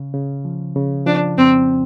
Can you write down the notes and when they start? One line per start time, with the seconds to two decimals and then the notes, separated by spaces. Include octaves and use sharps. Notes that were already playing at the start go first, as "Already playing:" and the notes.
Already playing: C#3
0.14 C#3
0.45 F3
0.76 C#3
1.06 F3 D4
1.37 F2 C4